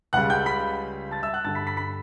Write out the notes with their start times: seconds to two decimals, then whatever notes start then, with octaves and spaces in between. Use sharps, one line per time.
0.13 C#2 C#3 G3 F#5 F#6
0.30 G5 G6
0.46 B5 B6
1.11 A5 A6
1.22 E5 E6
1.33 F#5 F#6
1.44 G2 D3 G3 A5 A6
1.55 B5 B6
1.67 B5 B6
1.77 B5 B6